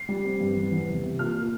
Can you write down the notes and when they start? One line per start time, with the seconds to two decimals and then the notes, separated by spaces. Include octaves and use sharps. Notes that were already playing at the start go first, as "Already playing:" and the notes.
Already playing: C7
0.09 G3
0.25 C4
0.41 G2
0.56 E2
0.71 E2
0.88 C3
1.03 C3
1.19 A#2 F6
1.35 A#2